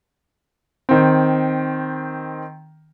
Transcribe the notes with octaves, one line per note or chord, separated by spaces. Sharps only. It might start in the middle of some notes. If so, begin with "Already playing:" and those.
D#3 C4